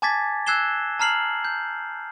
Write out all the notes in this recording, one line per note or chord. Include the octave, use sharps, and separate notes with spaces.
G#5 A5 D6 G#6 A6 B6
E6 F#6 G#6 C7 E7 G7
A5 A#5 F6 C7 F#7
G6